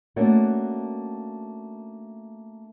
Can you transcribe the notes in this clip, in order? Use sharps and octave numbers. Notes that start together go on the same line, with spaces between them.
A3 A#3 C#4 D4 F#4